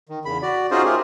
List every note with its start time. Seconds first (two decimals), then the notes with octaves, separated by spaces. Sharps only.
0.09 D#3
0.25 E2 C#3 B5
0.42 F#4 D5
0.71 C#4 D#4 F4 F#4 G#4 C5
0.85 A3 F4 G4 G#4 A#4